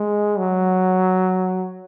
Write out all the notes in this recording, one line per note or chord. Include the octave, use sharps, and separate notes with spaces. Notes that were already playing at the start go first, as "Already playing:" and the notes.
Already playing: G#3
F#3